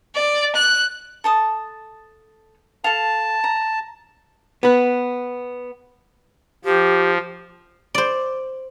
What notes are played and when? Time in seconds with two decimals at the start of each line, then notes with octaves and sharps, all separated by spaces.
0.15 D5
0.55 F#6
1.24 A4 A5 D#6
2.84 A4 F5 A5
3.44 A#5
4.63 B3 B4
6.65 F3 G4
7.95 C5 D5